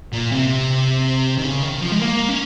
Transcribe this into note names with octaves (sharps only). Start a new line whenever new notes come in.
A#2
C3
D#3
C#3
D#3
F3
G#3
A#3
C#4